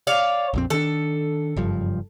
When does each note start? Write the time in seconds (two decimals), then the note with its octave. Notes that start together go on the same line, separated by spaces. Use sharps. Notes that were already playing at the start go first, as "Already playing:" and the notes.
0.07 C#5 D5 F5
0.54 A#1 F2 C4
0.70 D#3 D4 A4
1.57 F#1 G2 F3